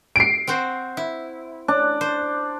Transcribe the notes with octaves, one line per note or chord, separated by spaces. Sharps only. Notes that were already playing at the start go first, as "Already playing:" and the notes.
C7 D7
C4 F#4 C5
E4
D4
C5